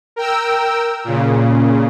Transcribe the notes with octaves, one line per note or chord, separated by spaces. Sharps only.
A#4 G5 E6
A#2 C#3